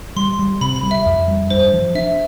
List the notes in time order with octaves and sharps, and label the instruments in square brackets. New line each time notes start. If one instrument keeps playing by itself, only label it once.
[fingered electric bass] G3 [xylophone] C6
[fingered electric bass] G3
[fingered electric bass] C3 [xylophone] B5
[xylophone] B5
[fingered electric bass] G3
[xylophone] E5
[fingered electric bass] F2
G3
[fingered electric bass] G2 [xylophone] C5
[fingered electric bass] F3
[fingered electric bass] D4 [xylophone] E5